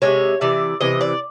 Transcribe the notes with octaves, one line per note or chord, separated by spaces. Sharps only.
C3 E3 G#3 C#5
C3 E3 D5
C3 E3 D#5
D5